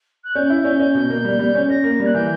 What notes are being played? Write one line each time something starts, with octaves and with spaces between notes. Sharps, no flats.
F#6
C#4 G6
E4
C#4
C#4
B2
A#3
G3
G3
C#4
C#4 A#6
A#3
G3
F#6
E3 G6